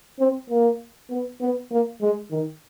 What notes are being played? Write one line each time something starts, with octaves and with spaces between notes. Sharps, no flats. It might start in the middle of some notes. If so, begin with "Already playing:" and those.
C4
A#3
B3
B3
A#3
G#3
D#3